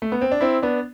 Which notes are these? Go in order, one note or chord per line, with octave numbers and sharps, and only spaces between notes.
A3
B3
C4
D4
C4 E4
B3 D4